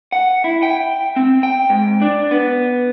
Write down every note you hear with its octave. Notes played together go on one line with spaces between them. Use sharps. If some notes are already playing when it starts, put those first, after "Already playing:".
F#5
E4
G5
C4
G5
G#2
D4
B3